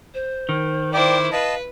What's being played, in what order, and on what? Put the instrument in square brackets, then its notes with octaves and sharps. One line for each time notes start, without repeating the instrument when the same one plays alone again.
[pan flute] C5
[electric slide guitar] D#3
[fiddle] E4 C5 [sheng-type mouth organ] D5 G5 [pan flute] D6
[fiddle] B4 [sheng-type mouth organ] D#5 A5 [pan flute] F5